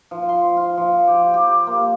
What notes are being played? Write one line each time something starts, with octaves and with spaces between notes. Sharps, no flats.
F3
C6
F4
F3
G4
G4
A#3